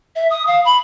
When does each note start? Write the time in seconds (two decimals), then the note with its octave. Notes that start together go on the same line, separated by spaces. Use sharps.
0.16 E5
0.30 D#6
0.47 F5
0.65 B5